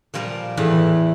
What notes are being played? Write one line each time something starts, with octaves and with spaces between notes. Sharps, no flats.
A#2 F3 G3 A#4
E2 A2 E3 B4